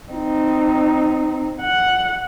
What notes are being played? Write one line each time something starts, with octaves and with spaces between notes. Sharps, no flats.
C4 D#4
F#5